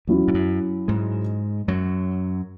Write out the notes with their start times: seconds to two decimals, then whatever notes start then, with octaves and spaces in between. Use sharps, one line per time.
0.07 E2 F#3 C#4 E4
0.28 G#2
0.34 F#2
0.88 G#2 G#3
1.68 F#2 F#3